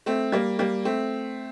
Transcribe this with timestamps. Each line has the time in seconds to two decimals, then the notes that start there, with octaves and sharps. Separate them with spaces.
0.06 A3 C4
0.32 G3 A#3
0.59 G3 A#3
0.85 A3 C4